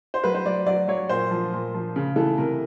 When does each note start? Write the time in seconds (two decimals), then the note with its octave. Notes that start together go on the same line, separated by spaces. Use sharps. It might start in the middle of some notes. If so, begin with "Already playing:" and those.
0.14 C5
0.24 F#3 B4
0.34 C5
0.45 F#3 D5
0.66 F#3 D5
0.88 F#3 C#5
1.09 A#2 C5
1.31 F3
1.53 A#2
1.74 F3
1.96 C#3
2.16 E3 A4
2.38 C3 A#4